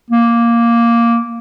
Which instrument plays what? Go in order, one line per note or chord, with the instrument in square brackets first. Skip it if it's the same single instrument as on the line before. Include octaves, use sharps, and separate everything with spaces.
[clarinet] A#3